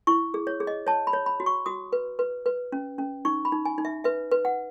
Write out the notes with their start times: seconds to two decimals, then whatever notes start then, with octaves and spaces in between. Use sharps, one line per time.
0.07 E4 C#6
0.34 G#4
0.47 C#5
0.60 G#4
0.67 D#5
0.87 C#5 A5
1.07 B5
1.13 C#5
1.26 B5
1.40 F#4
1.46 C#6
1.66 F#4 D#6
1.93 B4
2.19 B4
2.46 B4
2.72 C#4
2.98 C#4
3.25 D#4 C#6
3.45 B5
3.52 D#4
3.65 G#5
3.78 D#4
3.85 E5
4.04 B4 E5
4.31 B4
4.45 F#5